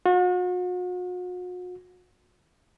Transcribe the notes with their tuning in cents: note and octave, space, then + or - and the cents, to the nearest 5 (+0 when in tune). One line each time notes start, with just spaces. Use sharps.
F#4 -40